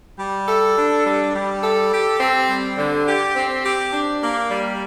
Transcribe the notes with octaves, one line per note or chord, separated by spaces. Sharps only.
G3
A4
D4
G3
G3
A4
G4
C4
G3
D3
G4
C4
G4
D4
A#3
G3